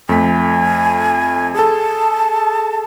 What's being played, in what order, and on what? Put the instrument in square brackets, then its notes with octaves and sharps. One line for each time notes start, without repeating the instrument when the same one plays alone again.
[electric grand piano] F2 A3 B6 [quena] G#5
[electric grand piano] G#4 A4 [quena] A5